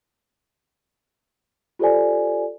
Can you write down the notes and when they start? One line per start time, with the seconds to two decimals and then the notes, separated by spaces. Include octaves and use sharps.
1.79 F4 G4 A4 C5 D5 G#5